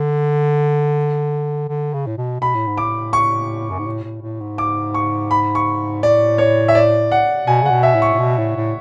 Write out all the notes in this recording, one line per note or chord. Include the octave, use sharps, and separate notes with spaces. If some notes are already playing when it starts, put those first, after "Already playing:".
Already playing: D3
D3
C#3
A2
B2
B2 B5
A2
G#2
A2 D6
C#6
F#2
G#2
A2
A2
A2
G#2
D6
C#6
B5
C#6
A2 D5
C#5
E5
D5
F#5
B2 G#5
C#3 F#5
B2
E5
A2
C#6
A2
B2
A2
A2